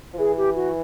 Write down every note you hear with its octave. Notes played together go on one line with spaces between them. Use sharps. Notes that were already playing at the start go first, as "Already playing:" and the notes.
F3
E3 G#4
G4
F#4